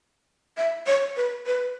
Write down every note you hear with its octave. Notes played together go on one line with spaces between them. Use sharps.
E5
C#5
B4
B4